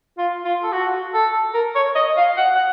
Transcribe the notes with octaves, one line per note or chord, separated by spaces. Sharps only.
F4
F4
A4
F#4
A4
A#4
C#5
D#5
F5
F#5
F#5